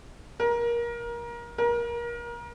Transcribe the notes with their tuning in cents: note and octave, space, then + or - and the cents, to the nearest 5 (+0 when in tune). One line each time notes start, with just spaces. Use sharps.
A#4 +25
A#4 +30